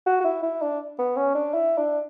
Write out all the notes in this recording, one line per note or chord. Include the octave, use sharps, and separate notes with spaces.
F#4
F#4
E4
E4
D4
B3
C#4
D4
E4
D4